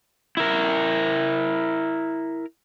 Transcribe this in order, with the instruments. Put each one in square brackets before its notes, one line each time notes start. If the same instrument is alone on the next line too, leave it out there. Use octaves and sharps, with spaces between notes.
[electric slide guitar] E4 A#4